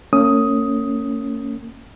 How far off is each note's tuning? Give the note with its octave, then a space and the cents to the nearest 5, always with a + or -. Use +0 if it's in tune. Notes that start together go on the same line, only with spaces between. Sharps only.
A#3 -40 C#4 +0 D#6 +10